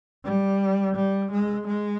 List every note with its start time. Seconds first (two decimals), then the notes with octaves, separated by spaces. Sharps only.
0.24 G3
0.95 G3
1.31 G#3
1.67 G#3